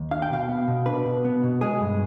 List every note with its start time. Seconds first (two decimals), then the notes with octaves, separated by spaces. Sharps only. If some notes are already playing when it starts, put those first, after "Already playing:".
Already playing: D#2
0.11 D4 F5
0.22 G5
0.31 B2 F5
0.48 B3
0.68 B2
0.86 D4 B4
1.06 B2
1.25 B3
1.43 B2
1.61 G#3 G#4
1.80 G2